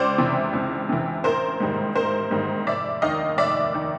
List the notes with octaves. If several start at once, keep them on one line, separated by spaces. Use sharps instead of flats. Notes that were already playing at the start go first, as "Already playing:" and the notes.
Already playing: C#2 C5 D5
C3 E3
C#2
C3 E3
A1 A#4 C5
G#2 D#3 G3 A#3
A1 A#4 C5
G#2 D#3 G3 A#3
F1 D5 E5
D#2 D#3 D#5 F5
F1 D5 E5
D#3